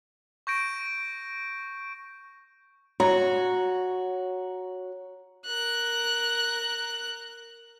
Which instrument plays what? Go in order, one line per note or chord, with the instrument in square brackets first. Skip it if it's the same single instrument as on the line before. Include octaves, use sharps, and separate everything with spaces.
[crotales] C#6 G6 A#6 D7
[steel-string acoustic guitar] F#4 [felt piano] C#5 A#5
[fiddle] A#4 F#6